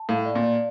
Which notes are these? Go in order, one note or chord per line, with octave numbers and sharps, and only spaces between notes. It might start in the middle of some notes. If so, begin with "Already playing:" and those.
Already playing: A5
A2 F5
D5
A#2
D5